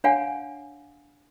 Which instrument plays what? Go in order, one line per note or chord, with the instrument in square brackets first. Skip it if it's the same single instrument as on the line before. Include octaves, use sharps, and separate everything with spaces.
[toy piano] D4 C#5 F5 F#5 G#5